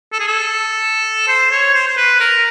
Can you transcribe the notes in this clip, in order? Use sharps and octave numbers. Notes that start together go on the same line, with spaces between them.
A4
G#4
A4
C5
C#5
C5
C5
B4
A#4